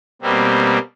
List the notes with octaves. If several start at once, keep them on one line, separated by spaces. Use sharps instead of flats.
B2 G3 A#3 C4